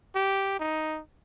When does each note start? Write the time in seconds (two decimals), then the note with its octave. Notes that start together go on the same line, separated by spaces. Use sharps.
0.15 G4
0.60 D#4